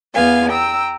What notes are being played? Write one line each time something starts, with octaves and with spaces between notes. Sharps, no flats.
E2 B3 F5 G#5
G5 A#5 E6